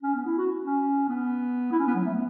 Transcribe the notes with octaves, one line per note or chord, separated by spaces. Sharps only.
C#4
B3
E4
F#4
C#4
B3
E4
C#4
B3
F#3
A3
B3